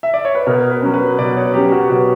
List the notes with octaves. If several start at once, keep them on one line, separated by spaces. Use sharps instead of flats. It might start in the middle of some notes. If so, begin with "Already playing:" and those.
E5
D5
C#5
B4
B2 A#4
B4
F#3 C#4
B4
B2 D5
C#5
F#3 C#4 G4
F#4
B2 F#4